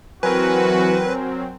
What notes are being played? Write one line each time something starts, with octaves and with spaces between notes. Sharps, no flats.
E3 F#3 C4 F#4 A#4 B4 G#5